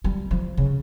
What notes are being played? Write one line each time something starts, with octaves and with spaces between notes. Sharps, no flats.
G3
F3
C#3